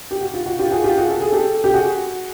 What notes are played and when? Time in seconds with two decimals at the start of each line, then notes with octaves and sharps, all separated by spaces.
0.11 G4
0.21 F#4
0.34 F4
0.46 F#4
0.59 F4 G4
0.71 F#4 G#4
0.84 F4 G4
0.97 F#4 G#4
1.10 A4
1.21 G#4
1.32 G4 A4
1.64 G4
1.73 F#4 G#4